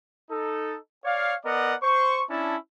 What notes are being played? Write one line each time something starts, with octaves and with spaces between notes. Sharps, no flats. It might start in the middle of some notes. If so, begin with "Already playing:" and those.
D#4 A4
C#5 D5 F5
B3 A#4 D5 D#5 F#5
C5 C#6
C#4 D4 E4 A5